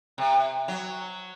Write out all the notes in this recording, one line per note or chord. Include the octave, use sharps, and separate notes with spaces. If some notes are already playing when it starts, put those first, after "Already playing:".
C3
F#3